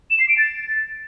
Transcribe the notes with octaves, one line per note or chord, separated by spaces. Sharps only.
E7
C7
D7
A6